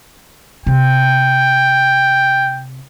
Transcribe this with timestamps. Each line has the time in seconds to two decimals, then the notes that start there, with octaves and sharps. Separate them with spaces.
0.66 C3 G5